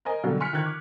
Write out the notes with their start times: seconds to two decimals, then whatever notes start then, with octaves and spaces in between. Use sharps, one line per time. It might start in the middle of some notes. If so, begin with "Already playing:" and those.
0.05 A#4 C5 D#5 G#5
0.24 B2 D3 F#3 G3
0.40 G#5 C6 F6 F#6 B6 C#7
0.53 D#3 F3 F6 F#6 G#6
0.66 D6